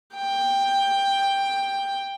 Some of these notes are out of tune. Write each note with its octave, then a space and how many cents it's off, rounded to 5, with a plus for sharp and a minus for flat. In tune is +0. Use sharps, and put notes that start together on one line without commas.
G5 +10